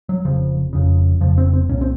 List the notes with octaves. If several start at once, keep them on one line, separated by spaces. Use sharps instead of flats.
F#3
F1 F2 C#3 F3
F1 F2 C#3
F1 F2 C#3 F3
C4
C4
C2 A#2 C#4
C4